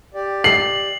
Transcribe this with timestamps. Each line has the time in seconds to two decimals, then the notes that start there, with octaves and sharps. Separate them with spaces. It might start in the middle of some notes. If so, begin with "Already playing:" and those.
0.14 G4 D5
0.44 C7 F#7